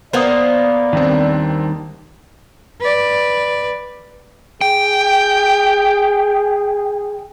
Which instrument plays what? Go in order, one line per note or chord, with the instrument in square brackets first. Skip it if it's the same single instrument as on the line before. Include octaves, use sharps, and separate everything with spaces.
[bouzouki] A#3 B3 [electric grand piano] C5 D#6 [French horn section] D5
[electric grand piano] D#2 C4 [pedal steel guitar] D#3 G3 D4
[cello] B4 D5
[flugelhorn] G#4 [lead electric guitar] G5